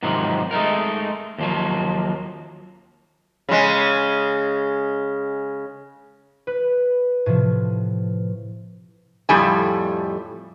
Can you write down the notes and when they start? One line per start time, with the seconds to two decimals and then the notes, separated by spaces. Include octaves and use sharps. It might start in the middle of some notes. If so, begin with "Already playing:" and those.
0.03 G#2 C3 D#3 F3 F#3
0.51 G#3 A3 D#4 A#4
1.38 D#2 F3 F#3
3.49 C#3 G#3
6.47 B4
7.26 A2 C3 F3
9.29 F2 A2 G3 A4 G#5